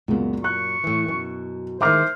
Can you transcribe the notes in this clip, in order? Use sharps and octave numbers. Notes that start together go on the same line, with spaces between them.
C#2 F#2 A#2 B3
C#6 F#6
A2 E3
F#2 B2
D#3 G#3 C5 E5 D6 F6